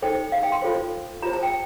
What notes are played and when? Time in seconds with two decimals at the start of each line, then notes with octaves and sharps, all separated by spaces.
0.02 D#4 A4 C5 G5
0.32 F5
0.43 G5
0.52 C6
0.62 F4 A4 C5
1.22 F4 C5 A#5
1.33 A5
1.43 G5